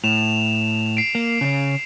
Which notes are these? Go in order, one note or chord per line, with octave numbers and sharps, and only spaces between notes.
A2 E7 F7
C7 D7
A#3
C#3 C#4